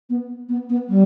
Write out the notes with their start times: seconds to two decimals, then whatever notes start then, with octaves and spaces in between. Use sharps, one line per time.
0.10 B3
0.49 B3
0.70 B3
0.89 G3